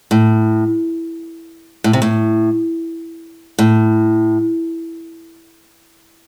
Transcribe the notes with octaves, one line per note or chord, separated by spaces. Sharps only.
A2
A2
C3
A2
A2